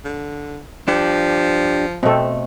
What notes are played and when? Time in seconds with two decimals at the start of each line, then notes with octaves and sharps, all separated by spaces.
0.05 D3
0.88 F3 D4 G4
2.03 B2 A3 C4 A4